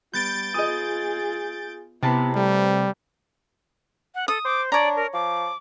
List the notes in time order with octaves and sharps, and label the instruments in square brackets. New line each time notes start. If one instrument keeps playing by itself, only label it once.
[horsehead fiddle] G3 [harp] B3 [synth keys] G6 A6 D7
[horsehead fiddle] F4 G#4 [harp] D#5 D#6
[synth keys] C3 [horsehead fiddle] B3 E4 [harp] B4 A5 A#5
[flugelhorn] G3 [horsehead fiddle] A3
[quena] F#5
[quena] A4 [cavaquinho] D#6
[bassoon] C5 [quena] D6
[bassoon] D4 [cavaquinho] C#5 A#5 [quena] D5
[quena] A#4
[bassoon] F3 [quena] D6